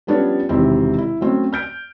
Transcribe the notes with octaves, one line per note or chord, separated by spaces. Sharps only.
F3 G3 B3 C#4 D4 C#5
E1 C3 D#3 C4 E4
E4
F#3 A3 C4 C#4
F6 G6 D7